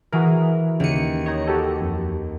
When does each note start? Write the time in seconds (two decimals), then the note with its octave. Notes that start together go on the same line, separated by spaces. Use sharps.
0.12 E3 F#4 G#4 A#4
0.80 D#2 C#3 C#7 D#7
1.26 D#4 C#5 D#5
1.47 F#4 G4 A4
1.81 F2